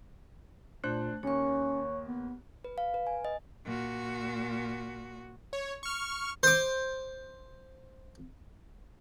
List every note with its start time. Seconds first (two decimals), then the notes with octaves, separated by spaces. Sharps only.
0.84 A#2 A3 D4 C5 F#6
1.23 D#2 A#3 C#4 C#5 C#6
2.07 B3
2.64 B4
2.78 F5
2.94 B4
3.07 G#5
3.25 D#5
3.65 A#2 F#4
5.53 C#5
5.83 C#6 F6
6.43 C5 D6